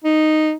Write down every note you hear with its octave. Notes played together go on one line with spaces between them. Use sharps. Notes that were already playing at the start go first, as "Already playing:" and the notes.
D#4